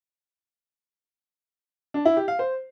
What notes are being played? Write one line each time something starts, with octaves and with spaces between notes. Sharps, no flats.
D4
E4
G4
F5
C5